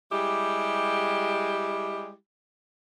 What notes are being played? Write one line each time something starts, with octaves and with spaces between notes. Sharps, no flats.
G3 G#3 E4 G4